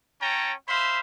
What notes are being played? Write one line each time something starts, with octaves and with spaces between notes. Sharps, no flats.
C#4 C#5 G5 A5 A#5
C5 E5 F5 B5 C6